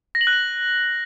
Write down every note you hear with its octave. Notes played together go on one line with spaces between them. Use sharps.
A#6
F#7
F#6
F#7